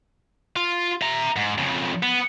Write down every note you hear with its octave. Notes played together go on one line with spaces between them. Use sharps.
F4
E5 A#5
G#2
F2 C#3
B3